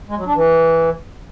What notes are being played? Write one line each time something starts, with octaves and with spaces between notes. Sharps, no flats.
G#3
F#3
D4
E3